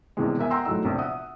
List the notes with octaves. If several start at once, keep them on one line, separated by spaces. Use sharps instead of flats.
A#1 E2 C3 E3 G#3
B2 A#4 E5 G#5
F#5 G5 A#5 C6 E6
E1 A2 F#3 A3 D#4 E6
A#1 C3
E5 F#5 D#6